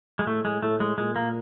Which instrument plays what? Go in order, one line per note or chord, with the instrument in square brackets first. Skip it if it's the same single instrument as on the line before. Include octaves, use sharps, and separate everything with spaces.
[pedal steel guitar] G#3
[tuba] A2 [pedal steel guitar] A3
[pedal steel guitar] G#3
[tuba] A2 [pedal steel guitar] A3
[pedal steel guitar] G#3
[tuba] A#2 [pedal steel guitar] G#3
[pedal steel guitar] A#3